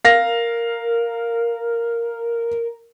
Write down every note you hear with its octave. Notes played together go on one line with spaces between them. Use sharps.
A#4 F5 A#6